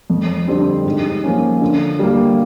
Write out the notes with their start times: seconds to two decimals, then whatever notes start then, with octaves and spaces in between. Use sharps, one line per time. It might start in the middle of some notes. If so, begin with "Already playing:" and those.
0.10 F2
0.48 D3 G3 C4
0.85 G#2
1.23 F3 A#3 C#4
1.61 D3
1.99 G3 A#3